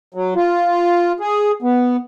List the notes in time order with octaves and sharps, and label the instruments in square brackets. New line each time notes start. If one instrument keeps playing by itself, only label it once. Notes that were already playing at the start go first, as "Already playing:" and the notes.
[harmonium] F#3
F4
G#4
B3